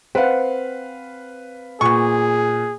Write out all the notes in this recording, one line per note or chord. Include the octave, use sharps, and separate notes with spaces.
C4 B4 F5 F#5
A#2 B3 G#4 C#6